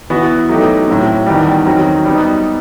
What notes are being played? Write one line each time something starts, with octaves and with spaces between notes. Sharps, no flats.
E3 B3 F#4
F#3 A3 D#4 G4
A2 F#3 C4
E2 D#3 G3
D#3 F#3 C4
G3 B3 D#4